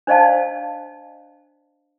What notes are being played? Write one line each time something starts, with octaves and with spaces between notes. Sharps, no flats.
D4 C5 D5 D#5 F5 A5